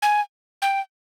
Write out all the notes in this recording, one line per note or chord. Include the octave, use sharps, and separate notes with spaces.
G#5
G5